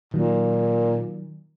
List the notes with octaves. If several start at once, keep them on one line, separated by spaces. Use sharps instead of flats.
A#2 D#3 F#3